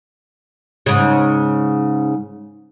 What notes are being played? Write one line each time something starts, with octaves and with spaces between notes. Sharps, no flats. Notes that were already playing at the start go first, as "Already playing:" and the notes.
G#2 C#3